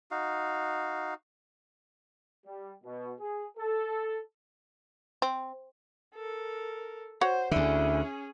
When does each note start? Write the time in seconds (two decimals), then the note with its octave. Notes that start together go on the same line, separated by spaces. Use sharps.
0.11 D#4 F#4 F5
2.46 G3
2.84 B2
3.20 G#4
3.58 A4
5.22 C4
6.15 A4 A#4
7.21 F#4 C5 C#5 F#5
7.51 D2 D3 C#4 E4 G#4